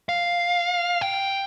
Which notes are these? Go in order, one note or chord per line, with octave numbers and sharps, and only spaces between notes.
F5
G5